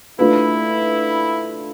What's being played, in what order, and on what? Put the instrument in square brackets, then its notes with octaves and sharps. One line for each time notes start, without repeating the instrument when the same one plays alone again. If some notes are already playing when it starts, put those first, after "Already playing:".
[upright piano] A3 D4 F4 B4 [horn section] E4